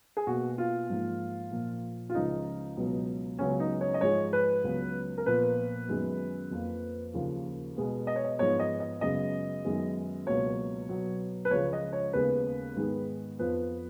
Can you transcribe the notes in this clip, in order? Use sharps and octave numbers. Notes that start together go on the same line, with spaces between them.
G#4
B2 A#3 F#4
F4
G#2 F3 A#3
A#2 F3 A#3
F4
C#2 C#3 F3 D#4
C#2 B2 F#3 B3
C#2 C#3 F#3 B3 C#4
D#4
C#5
D#5
G#2 F3 G#3 C#5
B4
C#2 C#3 F#3 B3
A#4
A#2 F3 B3 B4
F#2 D#3 G#3 B3
F2 F3 A#3
D#2 C#3 F3
B2 G#3 B3
D#5
C#5
D#5
G#2 F3 G#3 B3 C#5
D#5
D#5
F#2 C#3 G#3 B3 D#5
F#2 D#3 G#3 B3
C#2 B2 F#3 A#3 C#5
B2 F#3 B3
B4
C#2 C#3 F3 G#3 C#5
D#5
C#5
D#2 C#3 G#3 B3 B4
G#2 D#3 G#3 B3
F2 F3 B3 B4